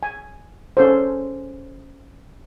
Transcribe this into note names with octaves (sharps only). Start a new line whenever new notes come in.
G#5
C#4 A4 C5